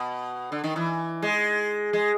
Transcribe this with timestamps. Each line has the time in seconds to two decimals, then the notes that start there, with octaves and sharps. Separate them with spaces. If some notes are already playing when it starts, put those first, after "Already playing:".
Already playing: B2
0.52 D3
0.64 D#3
0.76 E3
1.22 G#3
1.93 G#3